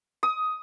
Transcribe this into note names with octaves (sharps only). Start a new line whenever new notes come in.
D#6